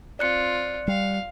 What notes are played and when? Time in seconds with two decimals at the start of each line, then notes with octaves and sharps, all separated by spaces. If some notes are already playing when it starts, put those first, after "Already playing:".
0.19 C4 F4 D5 F#6 C#7
0.88 G3 F5